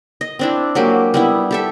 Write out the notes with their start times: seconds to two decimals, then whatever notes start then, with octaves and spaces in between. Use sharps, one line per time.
0.21 D#5
0.39 C4 D4 E4
0.75 F#3 G#3 A#3 G4
1.14 G3 B3 E4
1.51 G4 A4 E5